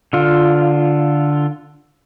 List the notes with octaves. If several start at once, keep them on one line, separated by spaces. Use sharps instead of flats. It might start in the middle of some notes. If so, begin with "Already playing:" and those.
D3 F4